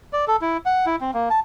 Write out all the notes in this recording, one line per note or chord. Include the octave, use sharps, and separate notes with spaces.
D5
A4
E4
F#5
E4
C4
A#3
A5